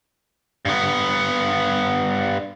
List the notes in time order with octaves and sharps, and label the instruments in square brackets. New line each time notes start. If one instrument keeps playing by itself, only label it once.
[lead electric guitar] G2 B3